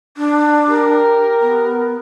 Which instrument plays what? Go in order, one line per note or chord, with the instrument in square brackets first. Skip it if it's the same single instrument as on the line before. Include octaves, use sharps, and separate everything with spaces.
[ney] D4
[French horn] G4 [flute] A#4
[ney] B3